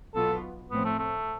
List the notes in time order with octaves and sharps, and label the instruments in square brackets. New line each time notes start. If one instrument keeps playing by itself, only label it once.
[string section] B1 B2 B3 F4 [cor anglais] A4
[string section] A2 F3 C4 [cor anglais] B3
[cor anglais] A3
A3